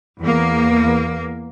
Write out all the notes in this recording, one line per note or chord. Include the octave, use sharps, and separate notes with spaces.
E2 A#3